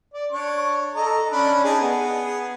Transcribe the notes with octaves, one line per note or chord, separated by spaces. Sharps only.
D5
D4 C#5 C#6
A4 D#5 A#5
C#4 D4 B5
D#4 G#4 A5
B3 G#4